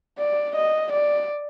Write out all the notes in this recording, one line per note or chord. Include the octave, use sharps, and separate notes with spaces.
D5
D#5
D5